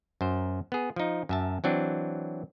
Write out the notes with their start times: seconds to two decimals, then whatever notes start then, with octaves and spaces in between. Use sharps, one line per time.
0.21 F#2 C5
0.72 B3 G#4
0.96 F3 D#4
1.29 F#2 E5 A5
1.64 E3 F#3 C4 D4